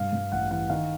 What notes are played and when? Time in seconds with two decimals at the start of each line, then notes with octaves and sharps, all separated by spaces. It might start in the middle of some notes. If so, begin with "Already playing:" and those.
Already playing: G2 F5
0.13 G2
0.32 A1 F#5
0.51 E3 F#5
0.70 D#3 F5